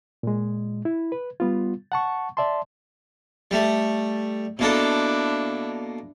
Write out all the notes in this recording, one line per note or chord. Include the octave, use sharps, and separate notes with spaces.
A#2 G#3
E4
B4
G3 B3 F4
F#5 A5 C#6
D5 E5 A5 C6
G3 A3
B2 A#3 D4 E4 A4